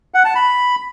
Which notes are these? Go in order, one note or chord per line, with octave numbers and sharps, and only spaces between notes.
F#5
A5
B5